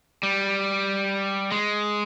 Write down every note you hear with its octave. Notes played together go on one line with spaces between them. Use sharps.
G3
G#3